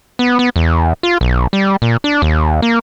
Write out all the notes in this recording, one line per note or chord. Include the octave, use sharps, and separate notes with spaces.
B3
B3
E2
F4
B1
G3
A#2
D4
D#2
A#3